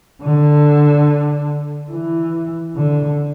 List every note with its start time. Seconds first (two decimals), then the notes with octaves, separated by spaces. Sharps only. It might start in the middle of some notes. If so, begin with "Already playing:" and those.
0.22 D3
1.91 E3
2.76 D3